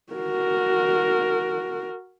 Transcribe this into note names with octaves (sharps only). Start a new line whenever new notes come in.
F#4 A#4